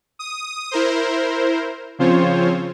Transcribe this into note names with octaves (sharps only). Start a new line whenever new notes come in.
D#6
E4 A#4 C5
C#3 F3 C4 F4 C5 C#5